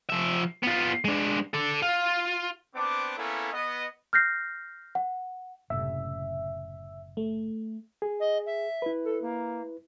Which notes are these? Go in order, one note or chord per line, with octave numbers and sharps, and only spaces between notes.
F3 E5
B3 F4
G#3 D4
A4 D5
F4
B3 C4 D4 D6
A#3 B3 C#4 E4 A4
B3 D#5
F6 G6 A#6 C7
F#5
F#1 A2 C3 E5
A3
G#4
D#5
E5
E4 B4
A4
A#3